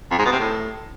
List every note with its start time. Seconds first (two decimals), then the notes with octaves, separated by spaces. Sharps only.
0.11 F2
0.18 G#2
0.25 B2
0.32 C3
0.39 A2